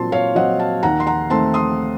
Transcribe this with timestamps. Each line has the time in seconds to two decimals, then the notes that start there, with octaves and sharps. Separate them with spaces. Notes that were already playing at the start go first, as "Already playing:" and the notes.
Already playing: A#2 F#3 C4 A5 C6
0.12 C#5 F5
0.35 F#3 C4 D#5 F#5
0.59 F5 A5
0.83 D#2 F#5 A#5
1.00 C6
1.06 F#5 A#5
1.30 D#3 A3 C4 A5 C6
1.54 C6 D#6